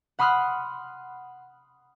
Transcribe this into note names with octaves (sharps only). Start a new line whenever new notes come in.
F#5 B5 C6 D#6 F6 F#6